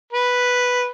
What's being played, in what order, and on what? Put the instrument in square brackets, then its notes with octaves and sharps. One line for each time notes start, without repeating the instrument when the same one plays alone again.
[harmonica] B4